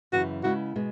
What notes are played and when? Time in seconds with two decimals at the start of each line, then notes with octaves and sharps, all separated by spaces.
0.13 F#2 C#3 E3 F#4
0.44 C#3 G#3 B3 E4 F#4
0.76 B2 G#3